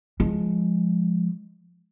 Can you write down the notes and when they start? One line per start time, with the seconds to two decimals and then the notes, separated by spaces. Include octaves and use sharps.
0.20 F3 G#3